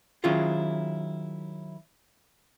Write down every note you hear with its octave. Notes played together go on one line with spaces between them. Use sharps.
D#3 F#3 C#4 E4 F4 G#4